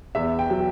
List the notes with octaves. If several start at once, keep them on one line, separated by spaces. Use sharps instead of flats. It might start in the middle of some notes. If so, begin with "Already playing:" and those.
E2 E5
G5
F#3